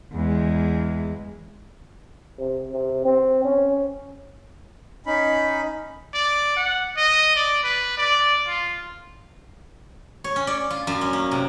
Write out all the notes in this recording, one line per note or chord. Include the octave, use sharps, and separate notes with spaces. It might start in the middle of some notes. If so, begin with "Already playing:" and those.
E2 G#3
C3
C3
C4
C#4
C#4 D#4 B5
D5
F#5
D#5
D5
B4
D5
F4
C#5
C#4
D5
F4
F#2
C#4
A#3
C3